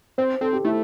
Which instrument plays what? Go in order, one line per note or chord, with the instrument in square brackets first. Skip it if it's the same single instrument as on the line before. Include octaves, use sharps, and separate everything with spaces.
[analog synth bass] C4 [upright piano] C5
[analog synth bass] C4 [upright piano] A4
[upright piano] G4
[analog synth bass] A3 [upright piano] E4